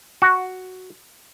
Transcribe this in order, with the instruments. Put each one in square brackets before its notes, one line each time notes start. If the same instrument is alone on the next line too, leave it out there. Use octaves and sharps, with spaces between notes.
[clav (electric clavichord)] F#4